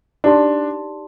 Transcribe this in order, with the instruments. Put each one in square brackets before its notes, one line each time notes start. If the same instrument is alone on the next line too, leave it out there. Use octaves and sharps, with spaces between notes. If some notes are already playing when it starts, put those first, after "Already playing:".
[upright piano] D4 [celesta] D#4 G4 D5 A5 C6